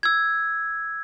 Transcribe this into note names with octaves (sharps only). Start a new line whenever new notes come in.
E6 G#6